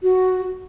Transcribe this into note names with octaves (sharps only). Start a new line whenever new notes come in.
F#4